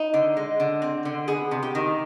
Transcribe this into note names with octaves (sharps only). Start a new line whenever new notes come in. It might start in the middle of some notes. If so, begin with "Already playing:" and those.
Already playing: D#4
D3
G#3
D3
C4
D3
B3 G#4
C3
G4
D#3